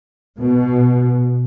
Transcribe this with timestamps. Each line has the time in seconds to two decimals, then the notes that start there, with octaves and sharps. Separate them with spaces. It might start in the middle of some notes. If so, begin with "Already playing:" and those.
0.40 B2